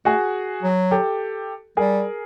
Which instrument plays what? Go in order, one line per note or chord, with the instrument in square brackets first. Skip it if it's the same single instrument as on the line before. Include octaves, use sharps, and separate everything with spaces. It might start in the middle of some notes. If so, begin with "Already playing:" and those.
[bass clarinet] A3 [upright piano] F#4 G#4
[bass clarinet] F#3
[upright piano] G4 A4
[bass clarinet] G3 [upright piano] G#4 A#4